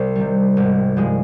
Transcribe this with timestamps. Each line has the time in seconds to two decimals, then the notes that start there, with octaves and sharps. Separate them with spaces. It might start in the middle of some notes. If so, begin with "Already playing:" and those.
Already playing: C2 C5
0.15 C3 D#3 G3
0.57 G#1
0.96 G2 F3 G#3